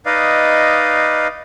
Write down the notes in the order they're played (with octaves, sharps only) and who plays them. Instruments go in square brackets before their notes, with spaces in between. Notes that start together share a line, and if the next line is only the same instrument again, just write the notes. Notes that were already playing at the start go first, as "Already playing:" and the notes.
[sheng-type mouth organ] D#4 B4 D5 D#5 F5